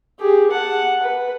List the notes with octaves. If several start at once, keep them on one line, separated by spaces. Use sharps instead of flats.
G4 G#4
F#5 A5
B4